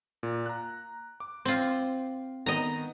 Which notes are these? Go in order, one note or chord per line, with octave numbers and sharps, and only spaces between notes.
A#2
A#5 F#6
D6
C4 F4
D#3 B3 D#5 A#5